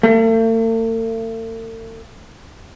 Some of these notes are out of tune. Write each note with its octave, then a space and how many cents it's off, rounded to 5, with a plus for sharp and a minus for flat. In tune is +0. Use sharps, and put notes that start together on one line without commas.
A3 +45